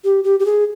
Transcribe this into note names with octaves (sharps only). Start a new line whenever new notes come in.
G4
G4
G4
G#4